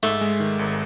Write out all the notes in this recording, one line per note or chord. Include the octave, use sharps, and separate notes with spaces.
G#2 A3
G#3
D#3
G#1